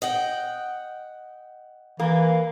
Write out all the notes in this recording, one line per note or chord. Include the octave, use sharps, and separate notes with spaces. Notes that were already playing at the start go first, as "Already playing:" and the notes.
D#5 F#5 G5
E3 A#3